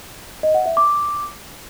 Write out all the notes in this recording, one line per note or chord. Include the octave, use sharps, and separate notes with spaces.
D#5
F#5
E5
D6